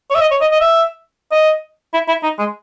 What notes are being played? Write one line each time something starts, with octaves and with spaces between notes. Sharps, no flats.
C#5
E5
D#5
C#5
D#5
D#5
E5
D#5
E4
E4
D#4
G#3